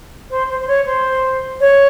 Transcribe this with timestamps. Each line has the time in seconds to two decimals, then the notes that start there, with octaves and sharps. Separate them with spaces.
0.30 C5
0.49 C5
0.60 C5
0.68 C#5
0.86 C5
1.60 C#5